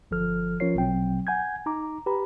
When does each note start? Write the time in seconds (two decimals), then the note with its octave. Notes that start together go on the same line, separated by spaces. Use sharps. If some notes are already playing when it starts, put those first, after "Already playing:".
0.11 G1 F3 A4 F6
0.60 F3 C#4 F4 A#4 C#5 C7
0.75 A#1 B2 F#3 C4 G5
1.27 F#5 G#5 G6 G#6
1.66 D#4 A#5 D6
2.06 G4 B4 A#5 B5